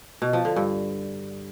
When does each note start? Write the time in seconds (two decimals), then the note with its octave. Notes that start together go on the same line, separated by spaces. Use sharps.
0.22 B2
0.33 F3
0.45 D3
0.56 G2